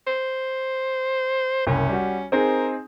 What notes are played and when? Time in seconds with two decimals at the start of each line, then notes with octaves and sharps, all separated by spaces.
0.07 C5
1.67 F#1 C2 C#4
1.89 G3 F#4
2.32 C4 D#4 G#4 A#4